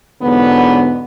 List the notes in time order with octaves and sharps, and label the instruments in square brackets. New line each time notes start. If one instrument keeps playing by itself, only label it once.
[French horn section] E2 G#2 D3 F#3 B3